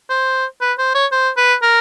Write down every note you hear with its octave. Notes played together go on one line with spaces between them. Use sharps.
C5
B4
C5
C#5
C5
B4
A#4